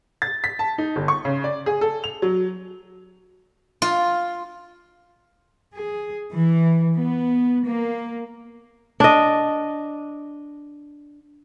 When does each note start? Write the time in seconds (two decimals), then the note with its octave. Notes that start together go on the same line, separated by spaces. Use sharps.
0.22 A6
0.44 B6
0.59 A5
0.78 D#4
0.96 G1
1.08 C#6
1.25 C#3
1.44 D5
1.66 G#4
1.81 A4
2.04 F7
2.22 F#3
3.82 F4
5.76 G#4
6.34 E3
6.97 B3
7.68 A#3
9.00 D4 D#5